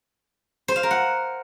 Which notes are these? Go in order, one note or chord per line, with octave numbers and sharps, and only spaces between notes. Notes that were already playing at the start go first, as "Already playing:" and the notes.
C5
F5
A#4
F#5